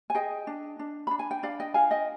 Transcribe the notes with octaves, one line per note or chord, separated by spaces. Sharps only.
G#5
G#4 D#5 G5
D4
D4
D4 B5
G#5
G5
D4 D5 F5
D#5 G5
F4 F5 G#5
D#5 G5